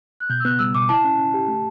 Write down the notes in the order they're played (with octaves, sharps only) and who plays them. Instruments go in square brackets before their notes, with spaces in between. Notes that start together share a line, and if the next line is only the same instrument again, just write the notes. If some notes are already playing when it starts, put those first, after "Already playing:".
[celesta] F#6
[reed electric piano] B2 [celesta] G6
[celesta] E6
[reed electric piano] B3 [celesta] F#6
[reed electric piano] G3 [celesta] E6
[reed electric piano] B2 [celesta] D6
[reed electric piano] E4 [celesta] A5
[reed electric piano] C#4
C#4
G4
A3